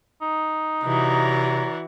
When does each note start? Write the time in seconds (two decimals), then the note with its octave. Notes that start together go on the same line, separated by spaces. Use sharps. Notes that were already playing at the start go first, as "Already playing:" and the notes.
0.22 D#4
0.84 C3 E3 F#4 C#5 D5 A#5